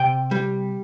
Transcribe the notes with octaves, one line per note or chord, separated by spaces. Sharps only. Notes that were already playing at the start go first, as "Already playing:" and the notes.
Already playing: C3 G5
G3